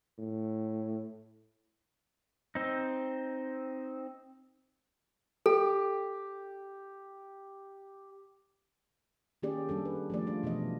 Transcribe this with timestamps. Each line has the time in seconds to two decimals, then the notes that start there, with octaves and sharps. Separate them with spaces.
0.19 A2
2.55 C4 D#4
5.46 G4 A4
9.43 D#3 A#3 C#4 G4 G#4 D5
9.69 G3 D4 A4
9.85 B4
10.10 F3 A3 D5
10.27 C#4 D4 F4
10.43 B2 E3 D4 D#5